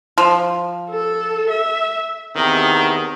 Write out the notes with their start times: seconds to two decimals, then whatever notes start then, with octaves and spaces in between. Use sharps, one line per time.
0.18 F3
0.91 A4
1.50 E5
2.36 E2 C3 D#3